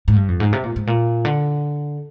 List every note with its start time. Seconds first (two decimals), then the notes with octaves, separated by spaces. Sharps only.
0.08 G#2
0.16 G2
0.28 F2
0.40 G#2
0.53 C3
0.64 A#2
0.76 G#2
0.87 A#2
1.25 D3